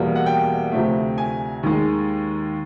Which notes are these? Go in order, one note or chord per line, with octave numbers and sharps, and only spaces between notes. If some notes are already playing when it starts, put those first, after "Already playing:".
Already playing: E2 B2 G3 A#3
F#5
G5
D2 C3 F3 A3
G#5
D#2 D#3 G#3